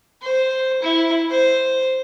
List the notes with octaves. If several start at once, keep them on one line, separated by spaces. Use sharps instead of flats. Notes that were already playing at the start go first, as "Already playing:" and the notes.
C5
E4
C5